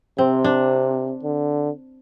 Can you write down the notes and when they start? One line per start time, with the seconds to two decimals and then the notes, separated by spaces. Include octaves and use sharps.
0.18 C3 C4
0.44 D4
1.23 D3